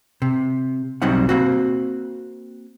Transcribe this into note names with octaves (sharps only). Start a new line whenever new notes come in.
C3
B1 F#3 G3 C4 D#4 F#5
A#3 C4 F#4